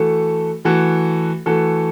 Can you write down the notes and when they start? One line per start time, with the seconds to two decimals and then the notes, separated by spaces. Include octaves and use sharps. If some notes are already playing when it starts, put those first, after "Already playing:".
Already playing: E3 A3 F#4 A4
0.65 E3 A3 F#4 A4
1.46 E3 A3 F#4 A4